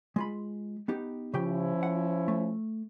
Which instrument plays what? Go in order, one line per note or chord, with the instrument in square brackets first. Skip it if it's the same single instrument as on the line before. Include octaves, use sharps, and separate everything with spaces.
[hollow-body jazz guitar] G#3 F4 B5
B3 D#4 G4
[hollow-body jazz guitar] C#3 G4 G5 [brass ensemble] F3 C#4 E4
[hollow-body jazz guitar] F#5
A3